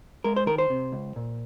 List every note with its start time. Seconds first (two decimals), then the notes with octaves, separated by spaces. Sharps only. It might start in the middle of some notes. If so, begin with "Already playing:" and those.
0.24 G#3 A#4
0.36 C5
0.46 D#3 A#4
0.58 C5
0.70 C3
0.92 C#2
1.16 A#2